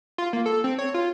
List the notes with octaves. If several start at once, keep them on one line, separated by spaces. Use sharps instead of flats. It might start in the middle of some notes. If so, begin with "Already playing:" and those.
F4
A#3
A4
C4
C#5
F4